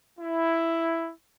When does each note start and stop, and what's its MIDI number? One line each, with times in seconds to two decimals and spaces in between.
0.20 1.11 64